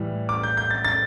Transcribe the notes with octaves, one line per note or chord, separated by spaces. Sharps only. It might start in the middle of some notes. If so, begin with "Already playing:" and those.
Already playing: A2 E3 G3
D6
G6
G6
A6
A6